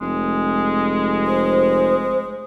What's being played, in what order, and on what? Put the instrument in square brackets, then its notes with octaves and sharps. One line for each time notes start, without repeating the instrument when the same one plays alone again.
[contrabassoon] F1 [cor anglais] G#3
[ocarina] C5